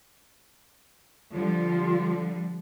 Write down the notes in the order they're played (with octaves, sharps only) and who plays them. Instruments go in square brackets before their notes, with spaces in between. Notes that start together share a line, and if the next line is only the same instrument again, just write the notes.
[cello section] D3 F3 G3 [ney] F4